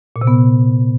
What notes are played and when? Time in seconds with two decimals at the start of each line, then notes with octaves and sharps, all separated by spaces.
0.16 A#2
0.21 C3
0.27 B3